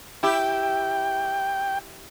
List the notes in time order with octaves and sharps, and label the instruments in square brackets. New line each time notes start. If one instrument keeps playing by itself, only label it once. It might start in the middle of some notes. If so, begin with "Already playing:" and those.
[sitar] E4 G4 [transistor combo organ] G5